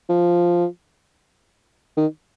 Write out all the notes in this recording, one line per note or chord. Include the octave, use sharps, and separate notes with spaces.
F3
D#3